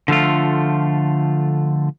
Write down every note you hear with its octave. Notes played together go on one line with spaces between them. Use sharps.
D3 F3 A3 F4